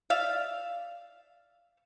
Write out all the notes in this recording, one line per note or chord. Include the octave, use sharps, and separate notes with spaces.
D5 E5 F5